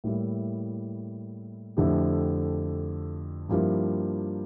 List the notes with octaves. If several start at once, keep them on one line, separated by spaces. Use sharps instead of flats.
A2 G3 A#3 E4
F2 D3 A3 E4 G4
G2 F3 A#3 E4 G4